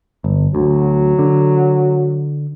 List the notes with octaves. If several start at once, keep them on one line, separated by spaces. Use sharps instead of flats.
G1
D2 F#3
D3